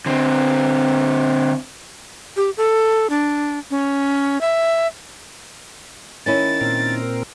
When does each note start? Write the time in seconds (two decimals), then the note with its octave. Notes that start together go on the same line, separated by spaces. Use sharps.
0.06 D3 C4
2.37 G4
2.57 A4
3.10 D4
3.71 C#4
4.41 E5
6.26 D#3 C#4 E4 A6
6.61 A#2 C4 A#4